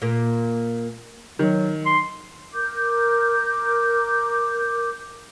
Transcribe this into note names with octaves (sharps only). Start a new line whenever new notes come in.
A#2 A#3
D#3 F#3
C6
A#4 D6 G6